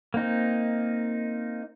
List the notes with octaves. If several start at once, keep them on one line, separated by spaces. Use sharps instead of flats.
A#3 C4 D#4